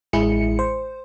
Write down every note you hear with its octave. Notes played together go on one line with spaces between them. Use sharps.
A1 G#3 E4 G#4 C#7
C5